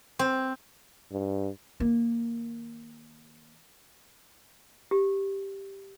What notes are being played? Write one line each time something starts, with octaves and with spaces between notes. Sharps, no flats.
C4
G2
D#3 A#3
G4